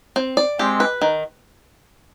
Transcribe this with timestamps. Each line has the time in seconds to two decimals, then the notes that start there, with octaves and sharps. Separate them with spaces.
0.16 C4
0.37 D5
0.59 G#3 C4 G4
0.80 B4
1.02 D#3